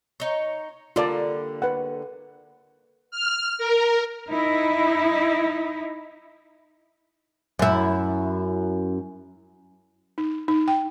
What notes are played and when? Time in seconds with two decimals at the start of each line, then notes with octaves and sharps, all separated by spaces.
0.20 D#4 C#5
0.96 D3 G3 A#3 F4 D5 A5
1.62 B4 F#5
3.11 F6
3.58 A#4
4.30 D#4 E4
7.59 F#2 E4
10.18 D#4
10.48 D#4
10.68 G5